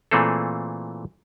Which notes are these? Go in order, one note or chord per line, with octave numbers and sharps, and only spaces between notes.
A#2 E3 A3 C4 G#4 A4